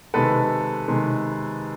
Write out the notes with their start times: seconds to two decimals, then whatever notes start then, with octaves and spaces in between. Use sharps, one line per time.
0.14 C3 D#3 G#3 A4 B4
0.88 C3 D#3 G#3